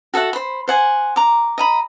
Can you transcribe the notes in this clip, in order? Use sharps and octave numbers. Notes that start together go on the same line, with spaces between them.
F#4 A4 E5 F#5
C5 B5
C5 F#5 G#5
A#5 D6
D#5 A#5 B5